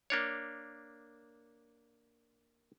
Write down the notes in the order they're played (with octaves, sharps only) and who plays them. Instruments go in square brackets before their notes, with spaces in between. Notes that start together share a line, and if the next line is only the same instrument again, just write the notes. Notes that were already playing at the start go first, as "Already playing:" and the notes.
[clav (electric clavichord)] A#3 D4 C#5